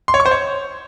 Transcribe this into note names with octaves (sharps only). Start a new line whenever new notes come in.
C6
C#5
C#6
C5
C#5